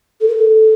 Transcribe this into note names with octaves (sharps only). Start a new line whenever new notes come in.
A4
A#4
A4